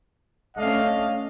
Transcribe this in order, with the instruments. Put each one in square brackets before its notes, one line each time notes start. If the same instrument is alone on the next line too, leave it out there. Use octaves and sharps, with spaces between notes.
[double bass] A3 C#4 [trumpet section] D4 D#5 F5